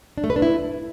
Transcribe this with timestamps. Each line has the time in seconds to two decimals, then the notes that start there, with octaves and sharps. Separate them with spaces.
0.18 D4
0.24 A3
0.30 B4
0.36 D4
0.42 E4